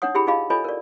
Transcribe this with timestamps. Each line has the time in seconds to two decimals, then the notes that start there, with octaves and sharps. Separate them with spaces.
0.02 D4 D#4 C#5 F#5 D#6
0.15 E4 G4 G#4 G5 B5
0.27 D#4 F4 G#4 D#5 F5 B5
0.50 F4 A4 C#5 D#5 G#5 B5
0.64 A#4 D5